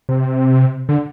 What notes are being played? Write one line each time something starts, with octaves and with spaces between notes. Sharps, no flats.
C3
D3